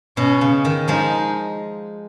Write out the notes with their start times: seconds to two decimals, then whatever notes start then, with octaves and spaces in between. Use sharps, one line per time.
0.17 B2 C#4
0.41 C#3
0.65 D#3
0.88 F3 G#3 D#4